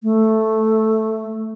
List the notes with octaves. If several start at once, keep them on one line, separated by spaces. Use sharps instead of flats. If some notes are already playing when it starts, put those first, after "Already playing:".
A3